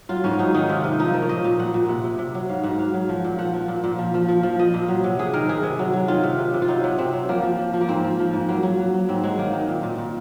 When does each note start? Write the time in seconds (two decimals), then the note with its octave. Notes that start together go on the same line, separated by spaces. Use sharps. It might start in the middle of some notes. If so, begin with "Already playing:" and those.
0.09 F#3 F4
0.24 G#2 C#4
0.39 F#3 D#4
0.54 D#3 D#4
0.69 C3 F4
0.83 C3 D#4
0.99 F3 D#4
1.13 F3 A#4
1.22 C#5
1.29 A#2 D#5
1.44 A#2
1.59 A#2 F#5
1.74 A#2
1.88 C3 F#5
2.04 C3
2.19 C3
2.34 F#3
2.49 G#2 F5
2.63 G#2 F#5
2.79 F#3 F5
2.94 F#3
3.09 F3
3.24 A#2
3.38 F3 F#5
3.54 F3
3.68 A#2
3.84 A#2
3.98 F3
4.14 F3
4.28 F3
4.43 F3
4.59 F3 D#5
4.74 A#2
4.88 F#3
5.04 C3
5.19 C3 G#4
5.33 D#3 A#4
5.49 C3 G#4
5.63 C3
5.79 F#3
5.93 F#3
6.08 D#3 F4
6.24 C3
6.39 C3
6.54 C3
6.62 F4
6.68 F#3 D#4
6.84 C3
6.98 C3 C4
7.13 F#3
7.29 F3 A#3
7.43 F3
7.59 F3
7.74 F3
7.81 A#3
7.89 G#2 C4
8.04 F3
8.19 F3
8.33 G#2
8.49 F#3 A#3
8.63 F#3
8.79 F#3
8.94 F#3
9.09 G#2 C4
9.23 F#3 G#3
9.38 D#3 A#3
9.53 D#3
9.68 A#2
9.83 A#2
9.98 A#2